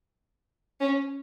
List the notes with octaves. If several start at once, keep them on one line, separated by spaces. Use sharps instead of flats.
C#4